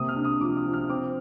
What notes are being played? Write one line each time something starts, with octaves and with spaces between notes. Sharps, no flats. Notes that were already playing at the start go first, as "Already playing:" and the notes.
Already playing: C3 A#3 D#6
F6
D4
D#6
F3 D6
D#6
F3
F6
C4 D6